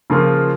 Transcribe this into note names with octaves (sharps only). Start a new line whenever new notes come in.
C#3 F3 A#3 F4